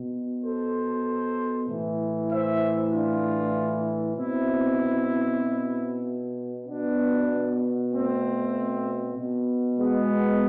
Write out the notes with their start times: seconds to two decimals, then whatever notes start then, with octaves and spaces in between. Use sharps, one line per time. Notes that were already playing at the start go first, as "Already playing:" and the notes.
Already playing: B2
0.43 A4 C5
1.68 A2 E3
2.31 C5 E5
2.92 D4 F4
4.17 B2 C4 E4
6.67 B2 B3 D4
7.92 A3 C4
9.17 B2
9.79 G#3 B3